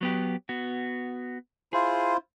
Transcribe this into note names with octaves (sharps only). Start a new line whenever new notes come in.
F#3 B3 G4
B3 F#4
E4 F4 G#4 C5